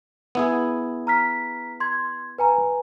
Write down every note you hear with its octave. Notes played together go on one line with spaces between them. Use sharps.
B3 E4 G#4
A#5 F6 B6
C6 G#6
B4 G#5 A#5